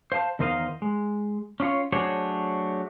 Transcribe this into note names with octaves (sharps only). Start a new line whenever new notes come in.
C5 F5 G5 A5
E2 D#3 A#4 C5 D#5 F5
G#3
C#4 D4 F4 C#5
F#3 A3 D4 G#4 C5 C#5